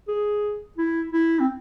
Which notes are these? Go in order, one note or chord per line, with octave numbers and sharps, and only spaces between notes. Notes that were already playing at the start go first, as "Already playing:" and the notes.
G#4
E4
E4
C4